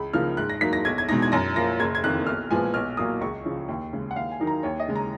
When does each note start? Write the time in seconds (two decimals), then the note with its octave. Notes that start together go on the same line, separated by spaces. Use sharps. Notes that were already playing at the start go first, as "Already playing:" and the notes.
Already playing: C#2 B5
0.13 C#3 F3 A#3 D#4 F6
0.37 G#2 F#6
0.49 A#6
0.61 F#3 A#3 D#4 B6
0.73 A#6
0.85 B1 G#6
0.98 G#6
1.09 B2 G#3 D#4 A#6
1.22 G#6
1.32 F#2 A#6
1.56 F3 A#3 A#6
1.80 F#1 G#6
1.95 G#6
2.04 F2 D#3 A#3 F#6
2.27 B1 F6
2.50 A#2 F3 G#3 B3 G#5
2.74 B1 F6
2.97 A#2 F#3 A#3 D#6
3.21 C#2 C#6
3.45 C#3 F3
3.69 D#2
3.93 C#3 G#3
4.11 F#5
4.16 D#2 F5
4.31 G#5
4.40 D#3 F#3 A#3 D#4
4.47 A#5
4.63 D#2 C#5
4.80 D#5
4.88 C#3 G#3
4.96 A#5